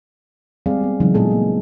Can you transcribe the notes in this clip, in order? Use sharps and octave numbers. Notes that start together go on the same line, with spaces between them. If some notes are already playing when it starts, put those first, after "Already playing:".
G3 G#3 C4 G#4 D5 F5
B3
C#3 E3 F#3 G#3 D#4
A#2 F#3 G#3 B3 G#4 A4
A#3